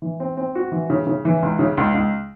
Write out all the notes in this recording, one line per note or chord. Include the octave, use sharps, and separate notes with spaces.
E3
C4
C4
F#4
E3
C#3
C#3
E3
C#2
C#3
C#2
C#2